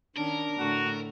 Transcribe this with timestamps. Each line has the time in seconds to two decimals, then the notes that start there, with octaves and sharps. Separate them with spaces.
0.16 D#3 C#4 D4 A#4
0.59 A2 D3 A3 F#4